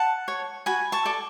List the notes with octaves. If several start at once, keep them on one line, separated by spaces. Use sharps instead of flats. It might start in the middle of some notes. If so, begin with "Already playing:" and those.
Already playing: F#5 A5
C#5
F#4 G#5 B5
A5 C#6
A4 D5